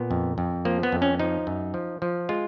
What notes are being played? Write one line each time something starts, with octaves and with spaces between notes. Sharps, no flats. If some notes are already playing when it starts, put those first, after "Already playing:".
Already playing: A#2 B3
F2
F2
F3 A#3
B3
F2
C#4
F3 D#4
F#2
F3
F3
G#3 F4